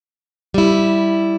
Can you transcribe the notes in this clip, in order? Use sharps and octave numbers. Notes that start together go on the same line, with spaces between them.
G3 E4